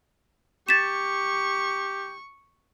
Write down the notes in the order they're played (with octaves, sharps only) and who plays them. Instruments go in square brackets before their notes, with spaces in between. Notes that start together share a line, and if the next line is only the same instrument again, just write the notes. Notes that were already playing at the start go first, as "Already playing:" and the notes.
[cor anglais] G4 [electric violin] C#6 [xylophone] A6 B6 E7